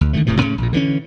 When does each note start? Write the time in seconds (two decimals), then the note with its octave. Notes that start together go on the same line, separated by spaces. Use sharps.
0.01 D2
0.13 D3 D#3 G3 A3
0.27 E1 A2 C3 E3
0.40 A2 C#3 C#4
0.58 A#1 A#2
0.73 D3 E3 F#3 C#4